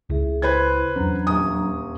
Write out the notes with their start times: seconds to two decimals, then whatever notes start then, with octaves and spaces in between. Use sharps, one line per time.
0.10 C#2 E4 G#4 E5
0.42 E4 B4 C5 G#6
0.96 E2 F#3 C#4 D4 A#5
1.27 D#1 D#6